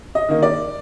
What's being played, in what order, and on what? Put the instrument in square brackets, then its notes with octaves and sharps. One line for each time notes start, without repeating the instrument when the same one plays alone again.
[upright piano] D#5
D#3 A#3 D#4
D5